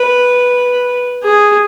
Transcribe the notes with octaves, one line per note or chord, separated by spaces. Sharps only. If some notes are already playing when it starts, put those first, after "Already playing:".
Already playing: B4
G#4